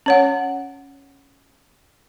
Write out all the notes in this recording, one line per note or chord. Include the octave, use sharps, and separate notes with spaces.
C#4 C#5 F#5